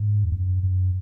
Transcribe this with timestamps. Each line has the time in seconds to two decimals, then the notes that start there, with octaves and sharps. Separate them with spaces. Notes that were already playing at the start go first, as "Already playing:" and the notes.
Already playing: G#2
0.24 E2
0.32 F#2
0.63 F#2